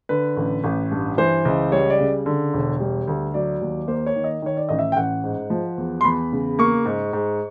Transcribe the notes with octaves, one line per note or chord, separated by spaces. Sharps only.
D3 B4
A1
A1
G2
E3 C5
C#2
G3 C#5
D5
C#3
D3
E1
G3
D2
F#3 D5
D#2
A#3 C5
C#5
D#3
D#5
D#3 C#5
D5
A1 D#5
E5
G5
A1 F#5
G#2
F3
E2
C6
E2 B5
C#3
A#3 C#6
G#2
G#2